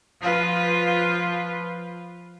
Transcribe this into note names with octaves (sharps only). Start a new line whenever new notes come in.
F3 F4 B4